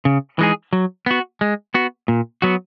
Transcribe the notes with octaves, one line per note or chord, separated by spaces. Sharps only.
C#3
E3 G#3 D#4 G#4
F#3
B3 F#4
G#3
B3 F#4
A#2
F#3 B3 F#4